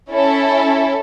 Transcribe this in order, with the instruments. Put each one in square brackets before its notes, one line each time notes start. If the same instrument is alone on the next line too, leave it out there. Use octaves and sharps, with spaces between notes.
[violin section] C#4 E4 A4